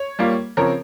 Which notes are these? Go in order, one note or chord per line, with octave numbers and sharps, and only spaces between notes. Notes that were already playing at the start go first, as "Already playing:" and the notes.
Already playing: C#5
G3 A#3 F4
C#3 F3 C4 A#4 C#5